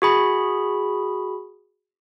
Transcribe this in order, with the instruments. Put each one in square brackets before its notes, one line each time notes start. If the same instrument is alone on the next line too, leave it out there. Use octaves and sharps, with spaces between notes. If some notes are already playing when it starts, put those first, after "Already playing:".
[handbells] F#4 G#4 B5